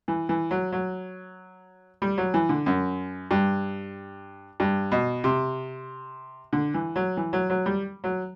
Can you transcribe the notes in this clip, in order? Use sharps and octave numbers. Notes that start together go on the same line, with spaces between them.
E3
E3
F#3
F#3
G3
F#3
E3
D3
F#2
G2
G2
B2
C3
D3
E3
F#3
E3
F#3
F#3
G3
F#3